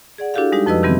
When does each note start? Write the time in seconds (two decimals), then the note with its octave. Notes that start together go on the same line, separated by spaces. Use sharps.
0.18 G#4 D5 F#5
0.34 D4 E4 F#4 G4 A4 F5
0.52 G3 G#3 D#4 G4
0.66 F2 F3 F#4 B4 D#5 E6
0.83 C3 D#3 E3 G3 B3 C4